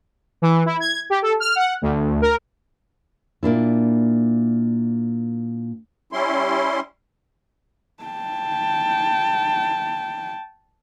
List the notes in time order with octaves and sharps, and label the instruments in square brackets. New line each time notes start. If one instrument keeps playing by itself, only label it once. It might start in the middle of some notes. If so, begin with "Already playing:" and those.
[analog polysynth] E3
E4
G#6
G4
A4
F6
F#5
D2
A#4
[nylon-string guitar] A#2 A#3 D4 E4
[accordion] G3 C#4 E4 C6
[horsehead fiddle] G5 A5